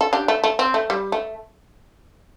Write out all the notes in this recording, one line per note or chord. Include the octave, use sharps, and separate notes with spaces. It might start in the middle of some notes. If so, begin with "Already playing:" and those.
A4
D4 G4
A3
A3
C4
A3
G3
A3